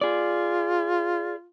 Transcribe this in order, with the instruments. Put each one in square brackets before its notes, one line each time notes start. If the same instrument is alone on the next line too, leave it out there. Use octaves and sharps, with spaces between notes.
[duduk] F4 [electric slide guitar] G#4 D5